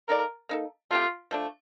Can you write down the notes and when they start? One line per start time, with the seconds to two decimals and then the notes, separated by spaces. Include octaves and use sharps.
0.08 A#3 D#4 A4 A#4 D5
0.49 A#3 D#4 A4
0.91 A3 C4 F4 G4
1.31 F3 A3 D4